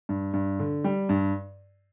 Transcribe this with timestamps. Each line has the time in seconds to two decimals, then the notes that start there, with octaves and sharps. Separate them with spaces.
0.09 G2
0.34 G2
0.59 D3
0.84 G3
1.09 G2